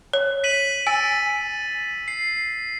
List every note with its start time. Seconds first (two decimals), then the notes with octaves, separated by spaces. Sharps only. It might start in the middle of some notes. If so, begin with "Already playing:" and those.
0.13 C#5
0.44 B6 D#7 F#7
0.87 G#5 E6 A6
2.08 C7